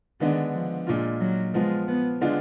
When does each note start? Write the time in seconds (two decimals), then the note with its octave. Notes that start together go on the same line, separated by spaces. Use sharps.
0.20 D3 D#3 G#3 B3 D4
0.54 F3
0.87 A#2 G#3 D4 F4
1.21 F#3
1.54 F3 G#3 B3 F4
1.88 B3
2.21 D3 G#3 B3 D4 F4